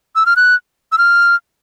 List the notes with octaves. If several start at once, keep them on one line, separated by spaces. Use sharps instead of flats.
E6
F6
F#6
E6
F6